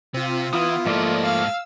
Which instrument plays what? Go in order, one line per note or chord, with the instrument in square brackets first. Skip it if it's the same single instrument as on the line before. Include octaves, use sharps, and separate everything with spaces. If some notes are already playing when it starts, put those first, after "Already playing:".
[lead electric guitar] C3 [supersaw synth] C4 F4
[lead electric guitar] E3 [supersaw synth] B3 E4 [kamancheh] F4 [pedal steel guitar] D#6
[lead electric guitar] G#2 A4 [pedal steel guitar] F3 A3 A#3 [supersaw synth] D5 D#5
[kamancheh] F5 [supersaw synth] E6